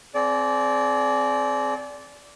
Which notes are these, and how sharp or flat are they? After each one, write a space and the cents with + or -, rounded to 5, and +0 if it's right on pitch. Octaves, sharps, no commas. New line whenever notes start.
C4 +0 G#4 +40 D5 -15